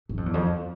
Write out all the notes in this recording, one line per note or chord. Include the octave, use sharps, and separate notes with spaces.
F#2
F2
E2
F2